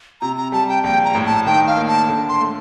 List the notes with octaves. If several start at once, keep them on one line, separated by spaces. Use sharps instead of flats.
C3 A#5
A#5
G3 A5
G5
A#1 G5
A#5
A2
A5
D#3 G5
F5
A#3
A5
D3
C6
A3